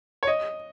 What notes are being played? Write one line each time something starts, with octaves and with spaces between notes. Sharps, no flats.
C#5
D#5